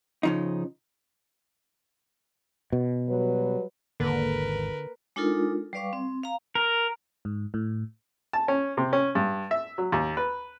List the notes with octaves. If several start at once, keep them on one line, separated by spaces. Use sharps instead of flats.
C#3 F3 D#4
B2
F#3 G3 B4
G#1 E2 D3 A#3 A#4 B4
G#3 D4 D#4 F4 A4 A#4
G3 B4 D5 F5 C#6 D6
C4
F5 A#5
A#4
G#2
A2
A5
C#4
C3
C#4
G2
E5
F#3
D#2
B4